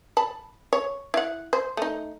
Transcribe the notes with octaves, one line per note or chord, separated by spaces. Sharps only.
A5 B5
C#5
E4 F#5
C5
A3 D#4